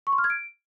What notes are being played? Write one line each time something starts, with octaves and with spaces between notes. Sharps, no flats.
C#6
C6
F6
G#6
D7